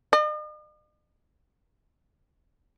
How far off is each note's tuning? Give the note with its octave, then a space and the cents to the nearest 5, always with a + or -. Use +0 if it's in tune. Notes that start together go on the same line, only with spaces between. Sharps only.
D#5 -45